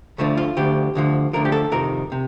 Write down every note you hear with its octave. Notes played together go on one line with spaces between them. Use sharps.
D2 D3 F3 A3
F4
D2 D3 F3 G4
D2 D3 F3
D2 D3 F3 A#4
G4
A4
F2 C3 D#3 A#4
C3